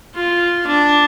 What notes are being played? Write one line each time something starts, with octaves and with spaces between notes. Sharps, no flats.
F4
D4